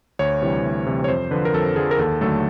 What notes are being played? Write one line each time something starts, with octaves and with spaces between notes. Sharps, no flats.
D2 C#5
C3 E3 G3
D2
C3 E3 G3
C#5
F2 C5
D3 F3 B4
A#4
F2 A4
D3 F3 G#4
A#4
D#2 A4
D3 F#3 A3 A4